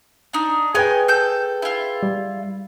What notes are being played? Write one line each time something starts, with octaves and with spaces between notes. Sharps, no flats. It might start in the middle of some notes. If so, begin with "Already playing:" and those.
D4 D#4
G#4 B4 C#5 D#5 G5 G#5
A4 G6
E4 F4
G3